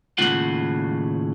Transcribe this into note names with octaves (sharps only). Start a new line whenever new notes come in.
D#2 A2 C#3 F4 F#5